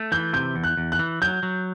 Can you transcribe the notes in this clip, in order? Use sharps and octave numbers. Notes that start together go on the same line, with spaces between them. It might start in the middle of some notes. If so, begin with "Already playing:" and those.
Already playing: A3
E3 G6
C3 G6
E2
F#6
E2
F#6
E3
F#3 G6
F#3